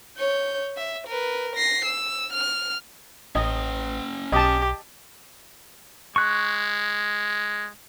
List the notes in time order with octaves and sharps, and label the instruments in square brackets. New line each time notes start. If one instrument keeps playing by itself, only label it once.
[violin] C#5 G6
E5
A#4 B4
A#6 C7
E6
F6
[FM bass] A1 [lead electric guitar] C#4 G5 [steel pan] D#5
[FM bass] B1 [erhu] G4 [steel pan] D#5 A5
[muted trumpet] G#3 [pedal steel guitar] C#6 F#6